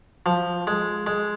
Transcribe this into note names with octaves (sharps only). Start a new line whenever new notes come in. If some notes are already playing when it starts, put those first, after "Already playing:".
F3
G#3
G#3